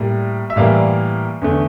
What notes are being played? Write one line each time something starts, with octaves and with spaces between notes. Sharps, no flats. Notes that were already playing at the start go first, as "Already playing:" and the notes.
Already playing: A2 G3 A#3
E5
A2 E3 G3 A#3 D5 F5
E2 D3 A3